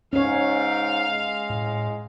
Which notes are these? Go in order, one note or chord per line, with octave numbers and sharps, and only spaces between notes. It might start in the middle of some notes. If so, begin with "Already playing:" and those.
G#2 C#4 C#5 F5
G#3
A2